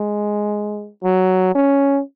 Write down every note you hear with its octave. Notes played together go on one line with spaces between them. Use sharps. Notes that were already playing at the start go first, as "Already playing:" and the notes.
Already playing: G#3
F#3
C#4